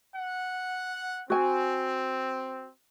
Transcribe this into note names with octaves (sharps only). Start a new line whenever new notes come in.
F#5
C4 F#4 G#5